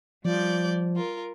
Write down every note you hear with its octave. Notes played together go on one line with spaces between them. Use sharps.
F3 G3 D5 G6
F4 A#4